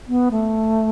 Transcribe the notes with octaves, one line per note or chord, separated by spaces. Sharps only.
B3
A3